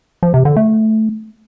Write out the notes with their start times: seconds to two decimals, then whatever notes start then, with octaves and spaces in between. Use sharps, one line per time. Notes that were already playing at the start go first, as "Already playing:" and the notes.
0.23 F3
0.34 C3
0.45 D3
0.57 A3